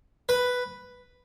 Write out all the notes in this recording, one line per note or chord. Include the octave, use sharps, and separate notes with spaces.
B4